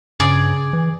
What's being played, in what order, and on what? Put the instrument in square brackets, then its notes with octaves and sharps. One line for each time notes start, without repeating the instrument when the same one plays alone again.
[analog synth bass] G2 [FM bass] C#3 [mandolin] G#4 D5
[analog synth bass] E3